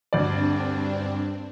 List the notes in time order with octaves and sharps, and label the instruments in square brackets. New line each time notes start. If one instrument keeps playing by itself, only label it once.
[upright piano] D2 D5 [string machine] G2 C4 D4